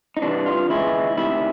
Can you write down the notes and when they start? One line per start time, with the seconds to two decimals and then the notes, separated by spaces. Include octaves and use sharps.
0.17 D#4
0.22 C2 C3 E3 D4
0.46 F4
0.70 D#2 C#3 E3 G#3 E4
1.17 D2 C3 D#3 E4